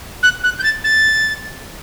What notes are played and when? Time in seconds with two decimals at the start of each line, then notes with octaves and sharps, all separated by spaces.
0.23 F#6
0.44 F#6
0.59 G6
0.63 A6
0.84 A6